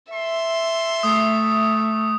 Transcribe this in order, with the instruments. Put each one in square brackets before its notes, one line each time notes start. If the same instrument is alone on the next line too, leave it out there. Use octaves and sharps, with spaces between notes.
[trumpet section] A4 C6 [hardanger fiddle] E5
[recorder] A3 [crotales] D#6